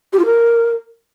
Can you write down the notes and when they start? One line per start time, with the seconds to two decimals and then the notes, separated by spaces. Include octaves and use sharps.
0.13 G4
0.19 F4
0.25 A#4